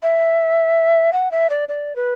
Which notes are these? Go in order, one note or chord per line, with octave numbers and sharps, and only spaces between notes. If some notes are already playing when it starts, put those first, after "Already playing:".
E5
F#5
E5
D5
D5
B4